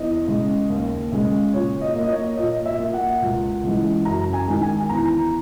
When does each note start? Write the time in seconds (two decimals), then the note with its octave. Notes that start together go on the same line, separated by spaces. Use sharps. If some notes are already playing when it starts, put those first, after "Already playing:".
Already playing: E2 D#5
0.27 C#3 G#3
0.70 D#2
1.12 C#3 G#3
1.54 A#2 C#5
1.81 D#5
1.95 A#3
2.04 D#5
2.10 C#5
2.37 A#2 D#5
2.66 E5
2.79 A#3
2.93 F#5
3.22 C#2
3.63 C#3 E3 G#3
4.05 F#2 A#5
4.33 G#5
4.48 D#3 G#3
4.62 G#5
4.89 E2 A#5